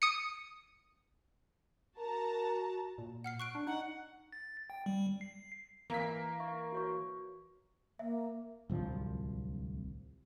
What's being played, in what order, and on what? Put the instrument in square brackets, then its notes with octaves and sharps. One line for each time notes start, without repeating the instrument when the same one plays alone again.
[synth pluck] D#6 C#7
[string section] F#4 A5 A#5 [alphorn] A#4
[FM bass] A#2
[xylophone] F#5 F6 C7
C#6 F#6 D7
[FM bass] D4
[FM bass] D#4 [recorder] F#5
[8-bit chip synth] A6
G5
G3
C7
[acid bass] E3 [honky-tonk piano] A#3 B6
[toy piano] E5 C#6
F#4 C#5 C#6
[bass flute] A#3 [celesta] E5
[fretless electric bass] D1 C2 F3